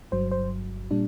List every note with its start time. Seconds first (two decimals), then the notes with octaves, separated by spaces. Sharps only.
0.12 G1 G2 F#3 C5
0.32 C5
0.91 A#2 G3 D4